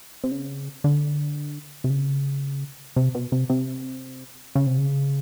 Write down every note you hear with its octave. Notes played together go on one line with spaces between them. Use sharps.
C3
C#3
D3
C3
C#3
C3
B2
C3
C3
C#3
C3
C#3